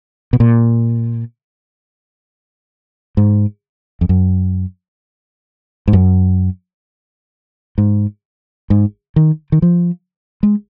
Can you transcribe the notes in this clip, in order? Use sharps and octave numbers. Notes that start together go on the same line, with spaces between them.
B2
A#2
G#2
F2
F#2
G#2
F#2
G#2
G#2
D#3
D#3
F3
G#3